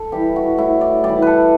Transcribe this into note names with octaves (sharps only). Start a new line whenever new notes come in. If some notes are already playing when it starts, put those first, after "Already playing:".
Already playing: A4
E3 G3 G4
F#4
A2 E4
D5
G3 D5
E3
A4 B4